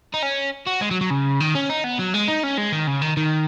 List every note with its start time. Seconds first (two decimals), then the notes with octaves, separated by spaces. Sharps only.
0.14 D#4
0.23 C#4
0.66 F#4
0.81 G#3
0.91 F#3
1.01 F#3
1.10 C#3
1.40 D#3
1.55 C#4
1.70 D#4
1.84 B3
1.99 F#3
2.14 G#3
2.28 D#4
2.43 C#4
2.58 G#3
2.72 D#3
2.87 C#3
3.02 D#3
3.17 D#3